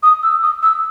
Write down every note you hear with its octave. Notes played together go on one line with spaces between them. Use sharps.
D#6
E6
D#6
E6